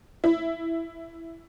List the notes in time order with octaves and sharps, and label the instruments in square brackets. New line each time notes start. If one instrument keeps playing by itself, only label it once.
[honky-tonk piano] E4